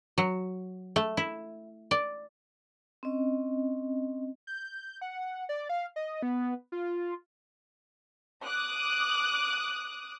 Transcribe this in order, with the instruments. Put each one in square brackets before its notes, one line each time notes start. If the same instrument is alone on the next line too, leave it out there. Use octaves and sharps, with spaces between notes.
[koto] F#3
A3
E4
D5
[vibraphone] C4 C#4 D#5
[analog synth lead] G6
F#5
D5
F5
D#5
B3
F4
[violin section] D6 D#6 F#6